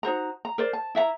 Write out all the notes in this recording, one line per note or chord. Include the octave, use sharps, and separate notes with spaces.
D#4 F#4 C5 A#5
A#5
A#4 C5 D5
A5
E4 E5 F5 A#5